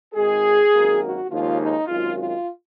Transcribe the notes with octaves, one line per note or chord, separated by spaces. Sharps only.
G#1 G#2 D#3 G#3 G#4
G#1 F#2 D#3 A#3
F#4
D#2 C#3 F3 G#3 F4
D#4
G#1 F#2 D#3 G#3 F4
F4